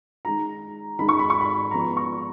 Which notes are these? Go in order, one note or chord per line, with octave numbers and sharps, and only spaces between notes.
D#3 G#3 D#4 A#5
D#3 G#3 D#4 B5
C#6
B5
C#6
B5
F3 G#3 B3 F4 A#5
C#6